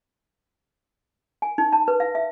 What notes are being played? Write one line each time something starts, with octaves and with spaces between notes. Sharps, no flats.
G#5
D#4
A5
B4
F5
E5